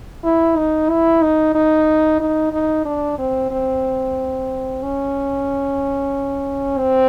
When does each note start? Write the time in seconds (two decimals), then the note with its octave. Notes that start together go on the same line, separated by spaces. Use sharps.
0.24 E4
0.57 D#4
0.89 E4
1.22 D#4
1.54 D#4
2.20 D#4
2.53 D#4
2.85 D4
3.18 C4
3.51 C4
4.82 C#4
6.77 C4